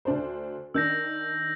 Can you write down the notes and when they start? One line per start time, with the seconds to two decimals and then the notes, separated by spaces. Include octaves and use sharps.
0.05 D2 D4 C5
0.74 D#3 D4 E6 G6 A#6